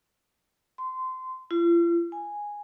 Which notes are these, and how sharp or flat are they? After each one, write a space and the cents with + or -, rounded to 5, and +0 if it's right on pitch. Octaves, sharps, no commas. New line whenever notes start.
C6 -20
F4 -45
G#5 -5